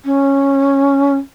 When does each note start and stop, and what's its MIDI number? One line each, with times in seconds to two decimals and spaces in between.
0.05 1.16 61